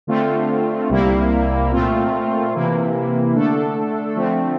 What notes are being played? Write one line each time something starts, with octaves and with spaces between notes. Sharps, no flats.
D3 A3 C4 F4
C2 C3 G3 A#3 E4
A#2 A3 C4 F4
C3 E3 A#3 E4
D3 A3 D4 A4
D3 F3 A3 C4